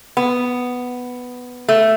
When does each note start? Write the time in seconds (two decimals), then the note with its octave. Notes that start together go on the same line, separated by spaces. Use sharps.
0.17 B3
1.68 A3